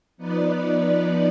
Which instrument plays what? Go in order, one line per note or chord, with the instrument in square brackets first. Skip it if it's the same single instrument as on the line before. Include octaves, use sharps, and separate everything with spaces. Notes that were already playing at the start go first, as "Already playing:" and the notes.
[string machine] F3 B3 D#4 B4 D5